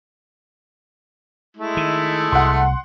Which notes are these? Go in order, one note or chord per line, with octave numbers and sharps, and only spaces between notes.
G#3 A3 E4
D#3
C2 F#5 C6